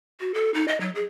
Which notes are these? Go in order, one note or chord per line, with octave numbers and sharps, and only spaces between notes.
F#4
A4
D#4
D#5
F#3
G#4